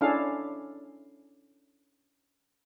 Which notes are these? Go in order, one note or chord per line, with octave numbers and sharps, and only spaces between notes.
C#4 D4 E4 G#4 A4 F5